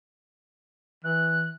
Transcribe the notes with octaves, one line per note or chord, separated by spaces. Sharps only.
E3 F#6